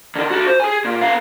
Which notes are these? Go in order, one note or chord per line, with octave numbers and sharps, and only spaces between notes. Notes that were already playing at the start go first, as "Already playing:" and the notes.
D3 D#3
F#4 A4
C5
G#4 G#5
A#2
B3 F5